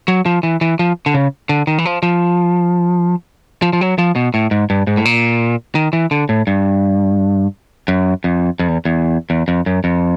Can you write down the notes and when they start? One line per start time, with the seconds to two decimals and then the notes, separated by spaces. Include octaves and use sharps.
0.08 F#3
0.26 F3
0.43 E3
0.61 E3
0.79 F3
1.06 D3
1.14 C#3
1.49 D3
1.67 D#3
1.78 E3
1.85 F3
2.03 F3
3.62 F3
3.73 F3
3.81 F#3
3.98 F3
4.16 B2
4.34 A2
4.51 G#2
4.70 G2
4.87 G#2
4.97 A2
5.05 A#2
5.75 D#3
5.93 E3
6.11 D3
6.29 A2
6.47 G2
7.88 F#2
8.24 F2
8.59 F2
8.68 E2
8.85 E2
9.30 E2
9.48 F2
9.66 F#2
9.84 F2